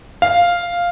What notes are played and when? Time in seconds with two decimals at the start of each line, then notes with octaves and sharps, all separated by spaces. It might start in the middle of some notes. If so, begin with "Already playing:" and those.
0.22 F5